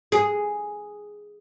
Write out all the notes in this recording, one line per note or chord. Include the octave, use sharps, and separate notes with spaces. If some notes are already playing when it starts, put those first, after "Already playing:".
G#4